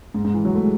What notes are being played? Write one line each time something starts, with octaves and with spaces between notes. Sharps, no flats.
G#2
G#2
E3
F#3
A3
G#3